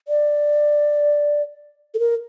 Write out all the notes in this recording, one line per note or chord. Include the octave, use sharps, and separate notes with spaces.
D5
A4
A#4